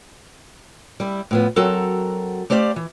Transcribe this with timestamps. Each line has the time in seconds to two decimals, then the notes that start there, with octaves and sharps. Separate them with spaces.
1.00 G3 E4
1.31 A2 F3 B3
1.56 F#3 C4 F#4 A4 A#4 A#5
2.50 A3 G4 C5 D5 F5
2.76 E3